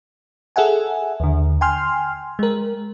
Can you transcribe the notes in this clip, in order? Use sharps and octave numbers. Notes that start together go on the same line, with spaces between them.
G#4 A4 E5 F#5 G#5
D#2 D3
G5 G#5 C6 F6
G#3 A#4